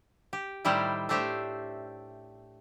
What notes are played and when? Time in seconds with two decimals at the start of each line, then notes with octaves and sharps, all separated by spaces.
0.33 G4
0.65 A2 D#3 G3 E4 G4 C5
1.09 A3 D4 G4 C5 E5